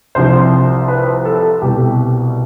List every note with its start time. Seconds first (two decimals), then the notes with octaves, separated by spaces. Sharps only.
0.15 C2 C3 F3 C5
0.88 B4
1.25 A4
1.62 C2 B2 G3 G4